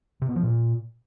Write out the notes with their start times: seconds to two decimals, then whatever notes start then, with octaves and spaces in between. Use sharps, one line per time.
0.22 C3
0.29 B3
0.36 F3
0.43 A#2